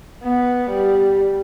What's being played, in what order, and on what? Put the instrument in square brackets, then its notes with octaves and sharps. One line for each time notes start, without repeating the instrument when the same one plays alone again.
[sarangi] B3
G3